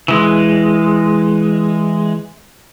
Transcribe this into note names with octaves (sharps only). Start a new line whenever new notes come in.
E3 G#3